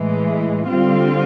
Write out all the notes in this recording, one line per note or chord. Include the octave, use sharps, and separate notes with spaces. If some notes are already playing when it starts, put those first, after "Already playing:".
Already playing: A2 E3 G#3
D3 G3 C4 F4